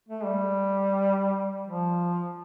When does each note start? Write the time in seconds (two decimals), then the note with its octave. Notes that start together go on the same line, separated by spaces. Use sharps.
0.09 A3
0.25 G3
1.67 F3